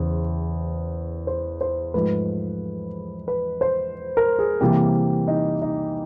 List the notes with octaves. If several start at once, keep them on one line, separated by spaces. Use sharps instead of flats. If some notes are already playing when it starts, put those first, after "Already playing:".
Already playing: E2 C#3 E3 C5
C5
C5
G#2 F3 A3 B4
B4
C5
A#4
G#4
C3 E3 G3 A#3 G4
D#4
D#4